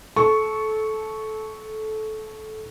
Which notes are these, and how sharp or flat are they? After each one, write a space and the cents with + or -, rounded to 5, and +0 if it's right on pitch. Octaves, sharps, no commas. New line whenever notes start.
A4 -20 C#6 +0